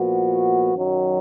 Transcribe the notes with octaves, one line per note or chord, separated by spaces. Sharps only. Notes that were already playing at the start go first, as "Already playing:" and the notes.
Already playing: A#2 F3 B3 F#4
F#2 D#3 F#3